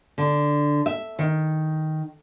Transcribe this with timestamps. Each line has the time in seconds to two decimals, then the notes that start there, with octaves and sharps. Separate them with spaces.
0.18 D3
0.86 E5
1.19 D#3